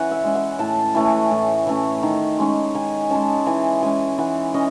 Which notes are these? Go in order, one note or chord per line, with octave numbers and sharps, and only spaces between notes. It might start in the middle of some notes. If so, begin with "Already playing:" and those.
Already playing: E3 C#4 F#5 G#5
E5
G#3 C#4
F#5
A2 A5
E3 A3 C#4 G#5
A2
E3 A3 C#4
D#3
G#3 C#4
D#3 G#5
G#3 C#4 A5
E3 G#5
G#3 C#4 G#5
E3 F#5
C#4 D#5